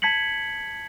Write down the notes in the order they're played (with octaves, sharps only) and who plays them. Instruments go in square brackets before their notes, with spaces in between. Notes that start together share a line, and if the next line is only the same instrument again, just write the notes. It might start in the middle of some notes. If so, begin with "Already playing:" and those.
[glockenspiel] A5 G#6 B6 C#7 F#7